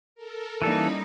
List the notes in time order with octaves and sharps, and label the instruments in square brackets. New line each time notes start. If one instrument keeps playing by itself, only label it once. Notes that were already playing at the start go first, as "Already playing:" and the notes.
[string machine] A4 A#4
[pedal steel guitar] E3 A4 [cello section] G3 A#3 D#4 [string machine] C#4 E4 B5